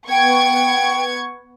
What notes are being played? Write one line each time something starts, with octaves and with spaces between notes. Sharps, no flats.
B3 G5 C#6 G#6